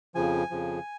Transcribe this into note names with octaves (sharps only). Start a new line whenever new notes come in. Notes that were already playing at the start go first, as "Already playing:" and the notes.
F2 C#3 F3 G#5
F2 C#3 F3